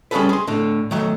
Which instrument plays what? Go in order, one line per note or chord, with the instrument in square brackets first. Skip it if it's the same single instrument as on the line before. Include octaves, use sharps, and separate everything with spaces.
[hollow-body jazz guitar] G3 C#4 D4 G#4 A4 B4
G#4 C6
A2 D3
D#3 F#3 A3